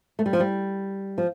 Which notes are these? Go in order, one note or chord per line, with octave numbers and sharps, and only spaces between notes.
A3
G3
F3
G3
F3